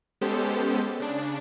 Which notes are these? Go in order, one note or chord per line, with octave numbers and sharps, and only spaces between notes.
G#3 B3 C#4 G4 A4 C5
C#3 D4